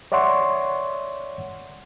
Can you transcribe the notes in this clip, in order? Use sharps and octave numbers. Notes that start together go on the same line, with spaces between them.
C#5 D5 E5 F#5 C6 C#6